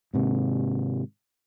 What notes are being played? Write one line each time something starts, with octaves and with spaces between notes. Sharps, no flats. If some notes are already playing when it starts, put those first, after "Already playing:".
G#2 C3 D#3